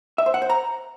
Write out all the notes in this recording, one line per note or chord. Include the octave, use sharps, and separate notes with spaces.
E5
C5
F#5
C5
A#5